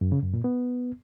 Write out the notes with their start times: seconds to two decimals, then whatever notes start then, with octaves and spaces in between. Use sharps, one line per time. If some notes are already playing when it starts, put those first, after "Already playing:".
0.01 F#2
0.12 C#3
0.23 F#2
0.34 A#2
0.44 B3